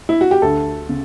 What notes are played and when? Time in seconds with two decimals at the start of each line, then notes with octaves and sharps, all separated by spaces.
0.09 E4
0.21 F#4
0.31 G4
0.42 D2 A4
0.89 C#3